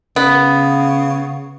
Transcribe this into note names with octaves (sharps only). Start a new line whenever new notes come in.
C#3 B3